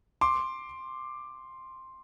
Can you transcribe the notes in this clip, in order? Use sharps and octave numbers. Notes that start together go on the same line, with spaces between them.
C6 D6